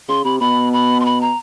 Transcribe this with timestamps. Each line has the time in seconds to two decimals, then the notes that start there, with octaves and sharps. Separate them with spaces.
0.08 C#3 C6
0.24 C3 B5
0.40 B2 B5
0.73 B5
1.00 C6
1.05 B5
1.21 A#5